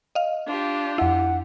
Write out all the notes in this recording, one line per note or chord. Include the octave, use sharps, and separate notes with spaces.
D#5 F5
D4 F4 G4
F2 E4 F#5